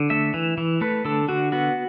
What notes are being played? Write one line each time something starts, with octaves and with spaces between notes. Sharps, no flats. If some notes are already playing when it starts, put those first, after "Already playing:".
Already playing: D3
A3 E5
E3
E3
A3 B4
D3 A4
D3 F#4
B3 F#4